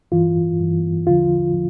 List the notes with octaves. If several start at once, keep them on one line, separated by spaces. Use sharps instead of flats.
G2 E3 F4
G2 E3
E2 D3 F3 F4
F3